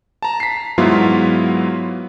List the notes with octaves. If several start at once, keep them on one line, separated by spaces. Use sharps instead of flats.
A5 A#5
B6 C7
G#2 F#3 B3 E4 F4